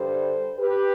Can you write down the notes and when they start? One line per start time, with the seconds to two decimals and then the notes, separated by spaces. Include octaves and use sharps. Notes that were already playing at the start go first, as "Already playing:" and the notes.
Already playing: G2 D3 G3 A4 C5
0.58 G4 B4